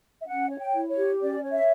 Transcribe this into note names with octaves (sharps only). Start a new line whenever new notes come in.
E5
C#4 F#5
C#5
G5
E4
C#5
G4
C#4 D5
C#5
E5